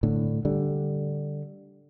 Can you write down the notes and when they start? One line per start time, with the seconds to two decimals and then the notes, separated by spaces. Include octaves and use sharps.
0.03 A2 D3
0.45 D3 G3